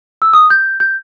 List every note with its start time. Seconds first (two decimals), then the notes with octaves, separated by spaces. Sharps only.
0.22 E6
0.33 D#6
0.50 G6
0.80 G6